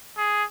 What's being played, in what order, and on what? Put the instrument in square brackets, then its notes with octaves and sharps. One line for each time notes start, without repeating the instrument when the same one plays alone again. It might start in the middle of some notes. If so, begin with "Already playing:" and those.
[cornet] G#4